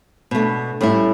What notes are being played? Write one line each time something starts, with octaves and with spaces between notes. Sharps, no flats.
B2 A3 D4
A2 G3 C#4 E4